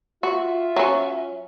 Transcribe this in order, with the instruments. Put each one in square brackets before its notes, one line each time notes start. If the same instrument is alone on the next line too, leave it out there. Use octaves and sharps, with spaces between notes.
[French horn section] F4 [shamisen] F#4 [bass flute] E5
[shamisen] F#3 C#4